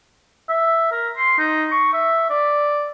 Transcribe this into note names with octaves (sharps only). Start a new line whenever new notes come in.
E5
A#4
C6
D#4
C#6
E5
D5